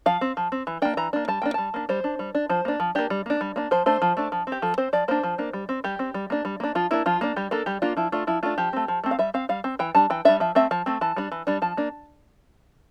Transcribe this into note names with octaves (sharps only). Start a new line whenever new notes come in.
F3 F5
C4
F3
C4
E3
A#3 D4 G5
E3 A#5
A#3 D4
G3 A5
A#3 D4 G5
G3 A5
A#3 D4
G3 C5
D4
G3
D4
F3 C5
A#3 D4
F3
A#3 D4 G4
G3
A#3 D4
G3
A#3 D4
F3 C5
A3 D4 C5
F3
A3 D4
F3
C4
G4
F3 A4
C4 C5
F3 D5
A#3 D4 C5
F3
A#3 D4
G3
C4
G3 G4
C4
G3
A#3 D4
G3
A#3 D4
F3 F4
A#3 D4 E4
F3 F4
A#3 D4
G3 G4
A#3 D4 A4
G3 G4
A#3 D4 F4
F3 E4
A3 D4 F4
F3 E4
A3 D4 F4
F3 G4
A3 C4
F3
A3 C4
F5
G3 E5
C4 F5
G3 F5
C4
E3 G5
G3 D4 A5
E3 G5
G3 D4 E5
F3 E5
A3 C4 E5
F3 A5
A3 C4
E3 A5
G3 D4
E3
G3 D4
F3 A5
A#3 D4